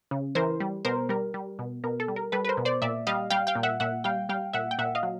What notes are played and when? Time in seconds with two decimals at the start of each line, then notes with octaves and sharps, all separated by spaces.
0.11 C#3
0.35 E3 A#4 C5
0.60 G3
0.85 B2 A#4 C5
1.09 G3 A#4
1.34 G3
1.59 B2
1.84 B2 A#4
2.00 A4
2.08 G3
2.16 A#4
2.32 G3 A4 B4
2.45 B4
2.49 A#4 C5
2.57 B2
2.65 C5 D5
2.82 A#2 D5 E5
3.07 G3 D#5 F5
3.30 G3 F5 G5
3.47 F5 G5
3.55 A#2
3.63 E5 F#5
3.80 A#2 E5 F#5
4.04 G3 F5 G5
4.29 G3 F5 G5
4.53 A#2 E5 F#5
4.71 G5
4.79 A#2 E5 F#5
4.95 D#5 F5
5.03 F#3